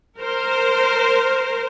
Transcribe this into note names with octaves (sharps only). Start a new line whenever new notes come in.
A#4 C5